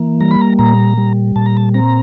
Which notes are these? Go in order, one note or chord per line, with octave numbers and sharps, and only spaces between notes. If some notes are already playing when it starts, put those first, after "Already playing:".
Already playing: E3 A#3
G3 A#5
B5
A#5
A#2 A#5
G3
A#2 A5
A#5
A5
C4 A#5